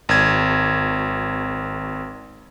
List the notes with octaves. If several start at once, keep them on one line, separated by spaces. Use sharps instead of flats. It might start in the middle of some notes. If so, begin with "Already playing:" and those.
G#1 G#6